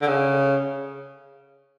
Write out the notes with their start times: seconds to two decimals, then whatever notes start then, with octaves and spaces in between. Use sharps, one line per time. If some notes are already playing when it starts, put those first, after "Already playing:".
0.01 D3
0.07 C#3